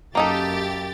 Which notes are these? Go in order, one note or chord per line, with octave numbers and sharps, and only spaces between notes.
F#2 A#3 D#4 G4 A4 A6